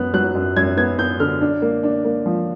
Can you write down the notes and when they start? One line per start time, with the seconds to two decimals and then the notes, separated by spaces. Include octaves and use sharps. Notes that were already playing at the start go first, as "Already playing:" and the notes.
Already playing: F#2 B3 F#6
0.13 F#3 F#6
0.35 F#2
0.56 F#2 G#6
0.77 B3 G#6
0.98 B3 G6
1.20 D3 F6
1.41 D4
1.62 A#3
1.83 D4
2.04 A#3
2.26 F3